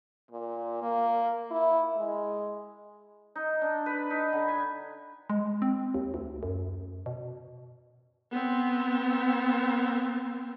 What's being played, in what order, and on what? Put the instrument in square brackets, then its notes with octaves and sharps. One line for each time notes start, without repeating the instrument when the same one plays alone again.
[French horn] A#2
A#3
E4
G#3
[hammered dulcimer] D#4
D4
B4
D#4
D3
G#5
[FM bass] G#3
C4
D#2
D2
F#2
B2
[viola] B3 C4